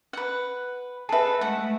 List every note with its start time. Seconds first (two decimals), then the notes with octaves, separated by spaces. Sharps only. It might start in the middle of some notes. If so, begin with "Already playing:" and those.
0.13 B4 F#5
1.09 G#4 A4 B4 E5 A5
1.41 G#3 A3 F#5